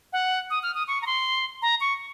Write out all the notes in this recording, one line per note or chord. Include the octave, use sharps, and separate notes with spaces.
F#5
D#6
F6
D#6
C#6
A#5
C6
A#5
C#6